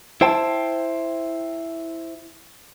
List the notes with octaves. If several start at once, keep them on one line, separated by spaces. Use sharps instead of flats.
E4 C5 G5 A5